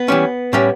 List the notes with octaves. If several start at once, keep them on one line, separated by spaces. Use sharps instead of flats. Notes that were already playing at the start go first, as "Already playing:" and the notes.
Already playing: B3 B4
E3 G3 C#4
A2 G3 C#4